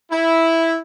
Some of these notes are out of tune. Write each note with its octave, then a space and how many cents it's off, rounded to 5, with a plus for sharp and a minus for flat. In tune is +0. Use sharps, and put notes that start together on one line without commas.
E4 -5